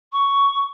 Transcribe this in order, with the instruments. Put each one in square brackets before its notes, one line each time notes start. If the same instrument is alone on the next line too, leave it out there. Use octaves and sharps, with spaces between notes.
[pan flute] C#6